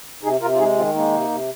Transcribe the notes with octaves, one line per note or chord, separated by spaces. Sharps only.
C3 D#4 G#4
C3 F4 A#4
F4
G#3 D#4 G#4
D#3 C4 F4
G#3 A#3 D#4
C3
C3